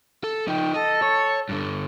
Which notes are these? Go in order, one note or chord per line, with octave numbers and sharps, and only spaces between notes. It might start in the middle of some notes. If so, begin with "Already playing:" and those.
A4
F3 D#4 G5
A4 D#5
C#5
G2 D3